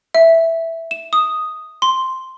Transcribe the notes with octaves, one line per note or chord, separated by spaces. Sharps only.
E5
E7
D#6
C6